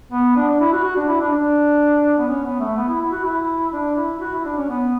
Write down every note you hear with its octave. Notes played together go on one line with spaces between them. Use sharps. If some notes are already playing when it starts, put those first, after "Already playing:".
B3
D4
D4
E4
F#4
F#4
D4
E4
D4
D4
B3
C#4
B3
A3
B3
E4
E4
F#4
E4
D4
E4
E4
F#4
E4
D4
C#4
B3